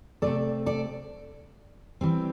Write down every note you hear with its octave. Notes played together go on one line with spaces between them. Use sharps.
C3 A3 C4 A4 D5
A4 D5
E3 G3 C4